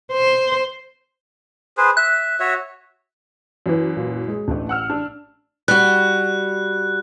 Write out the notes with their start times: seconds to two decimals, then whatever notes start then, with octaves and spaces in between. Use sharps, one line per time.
0.13 C5
1.77 G#4 B4 C5
1.97 E5 F#6
2.40 F#4 C#5 E5
3.66 F#2 E3
3.97 A#2
4.28 G#3 G#4
4.48 A1 A3 D4
4.69 F#5 E6 F6
4.90 D4
5.68 G3 F#4 F#6